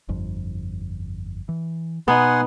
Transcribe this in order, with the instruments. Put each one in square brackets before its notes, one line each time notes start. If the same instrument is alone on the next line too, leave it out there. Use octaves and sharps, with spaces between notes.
[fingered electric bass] G1 F2
E3
[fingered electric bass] B2 [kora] B3 D#4 [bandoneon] F#5 G#5 C6